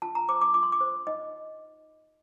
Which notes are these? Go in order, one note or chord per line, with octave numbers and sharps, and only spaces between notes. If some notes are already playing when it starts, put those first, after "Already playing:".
F4 A5
A#5
C5 D6
D6
F4 D6
C6
D6
C5
D#4 D#5